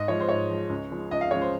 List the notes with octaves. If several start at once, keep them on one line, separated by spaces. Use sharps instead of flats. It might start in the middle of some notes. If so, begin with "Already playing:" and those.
Already playing: G#2 D#5
F3 G#3 C#5
C5
G#2 C#5
F3 G#3
C#2
C#3 F3 G#3
C#2 D#5
F5
C#3 F3 G#3 C#5
C5